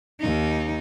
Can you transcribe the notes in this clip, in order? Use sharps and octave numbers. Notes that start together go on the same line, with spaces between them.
D#2 D#4